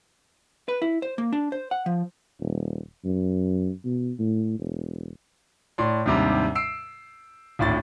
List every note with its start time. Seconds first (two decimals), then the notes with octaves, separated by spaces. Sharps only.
0.68 B4
0.82 E4
1.02 C5
1.18 A#3
1.33 D4
1.52 C5
1.71 F#5
1.86 F3
2.40 D#1
3.04 F#2
3.85 B2
4.19 A2
4.59 E1
5.78 A2 D5 C6
6.06 D#2 G#2 C3 G3 D4
6.55 E6 C7 D7
7.59 G#1 D2 A2 A6